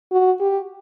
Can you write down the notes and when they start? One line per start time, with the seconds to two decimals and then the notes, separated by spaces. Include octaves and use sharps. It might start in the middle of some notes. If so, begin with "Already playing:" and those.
0.12 F#4
0.40 G4